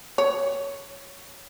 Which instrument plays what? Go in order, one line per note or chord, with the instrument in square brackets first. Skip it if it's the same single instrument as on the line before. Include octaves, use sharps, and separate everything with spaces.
[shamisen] C#5